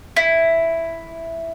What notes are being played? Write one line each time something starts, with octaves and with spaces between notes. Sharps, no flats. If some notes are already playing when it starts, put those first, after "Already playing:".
E4